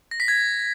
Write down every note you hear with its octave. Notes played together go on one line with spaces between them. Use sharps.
A#6
B6
G#6